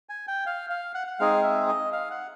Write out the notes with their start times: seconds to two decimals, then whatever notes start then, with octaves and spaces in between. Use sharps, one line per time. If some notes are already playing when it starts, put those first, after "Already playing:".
0.09 G#5
0.28 G5
0.46 F5
0.70 F5
0.95 F#5
1.07 F#5
1.19 G#3 C4 D#4 G#4 F5
1.43 E5
1.68 D#5
1.92 F5
2.10 F#5